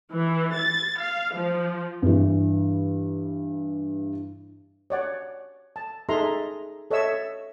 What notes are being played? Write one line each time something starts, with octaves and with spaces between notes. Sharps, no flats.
E3
A6
F5
F3
G2 E3
C#5 D5 F#5
A5
D#4 G#4 A4 E5 A#5 C6
A4 C#5 D#5 E5 E6